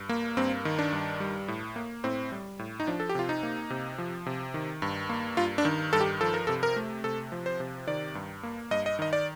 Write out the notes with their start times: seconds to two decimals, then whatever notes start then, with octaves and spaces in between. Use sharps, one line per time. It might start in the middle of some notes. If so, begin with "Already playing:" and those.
Already playing: G2
0.09 A#3
0.37 G2 C4
0.65 D#3
0.79 D4
0.92 G2
1.20 G3
1.48 A2
1.76 A#3
2.04 A2 C4
2.32 G3
2.59 A2
2.80 D#4
2.87 F3 D4
3.00 A4
3.09 G4
3.15 C3 F4
3.29 D#4
3.43 A#3
3.70 C3
3.98 F3
4.26 C3
4.54 D#3
4.82 G2
5.09 A#3
5.37 G2 F4
5.58 D4
5.65 D#3
5.93 G2 A4
6.01 G4
6.21 F3 A4
6.34 A#4
6.47 C3 A4
6.63 A#4
6.76 A3
7.04 C3 A4
7.32 F3
7.46 C5
7.60 C3
7.87 D#3 D5
8.15 G2
8.43 A#3
8.71 G2 D#5
8.86 D#5
8.99 D#3 D#5
9.13 D5